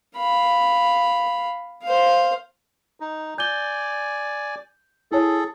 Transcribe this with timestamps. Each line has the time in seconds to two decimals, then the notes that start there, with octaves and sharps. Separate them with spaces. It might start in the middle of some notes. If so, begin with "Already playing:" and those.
0.17 F5 B5
1.84 C5 F5
3.00 D#4
3.38 D5 G#5 G6 G7
5.12 E4 G#4 A4 C#5